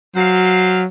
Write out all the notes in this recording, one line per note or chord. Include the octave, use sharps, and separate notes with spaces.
F#3 C5 F5